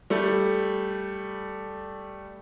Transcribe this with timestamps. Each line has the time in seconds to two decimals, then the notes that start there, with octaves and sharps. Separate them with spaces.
0.10 G3 A3